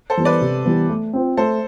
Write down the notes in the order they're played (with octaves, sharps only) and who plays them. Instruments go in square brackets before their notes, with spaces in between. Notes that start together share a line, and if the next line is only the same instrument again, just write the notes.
[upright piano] A4 C5
[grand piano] E3 G3 B3
[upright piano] B4 D5
[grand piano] C3
E3 G3 B3
A3
C4 F4 C5
[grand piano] A3 [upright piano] A4 C5